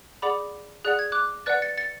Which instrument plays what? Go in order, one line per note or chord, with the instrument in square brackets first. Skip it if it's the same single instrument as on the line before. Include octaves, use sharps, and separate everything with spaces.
[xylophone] G#4 D5 F#5 B5 D6
G#4 D5 F#5 F#6
G#6
D6 F#6
B4 D5 F#5 F#6 A6
A6 C#7
A6 C#7